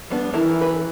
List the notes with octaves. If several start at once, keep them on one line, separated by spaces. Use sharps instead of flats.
G3 B3 D4
E3 E4 A#4
B4